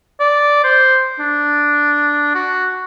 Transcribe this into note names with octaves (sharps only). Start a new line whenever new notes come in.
D5
C5
D4
F#4